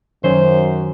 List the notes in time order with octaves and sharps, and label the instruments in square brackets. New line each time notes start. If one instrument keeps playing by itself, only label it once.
[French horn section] F#2 [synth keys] D#3 F#3 C#4 [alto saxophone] C5